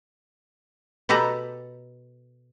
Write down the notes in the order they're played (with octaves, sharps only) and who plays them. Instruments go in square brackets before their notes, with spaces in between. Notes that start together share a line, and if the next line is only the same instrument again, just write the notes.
[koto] B2 G4 A4 B4 A#5